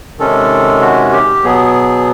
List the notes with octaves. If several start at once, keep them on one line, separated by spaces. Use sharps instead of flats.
C3 D#3 G#3 C#4 A4
F#4
G4
B2 F#3 B3 G#4